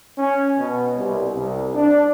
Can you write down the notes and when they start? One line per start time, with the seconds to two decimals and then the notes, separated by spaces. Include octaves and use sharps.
0.18 C#4
0.57 B2
0.96 C2
1.35 C2
1.75 D4